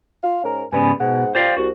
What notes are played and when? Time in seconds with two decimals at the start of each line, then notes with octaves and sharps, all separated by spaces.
0.23 F4 F5
0.44 G#2 C#4 A#4
0.73 G#2 C#3 G3 B3 B4 G#5
1.00 G#2 B2 G#4 F#5
1.35 F4 G4 C5 D5 F5
1.57 C2 F#4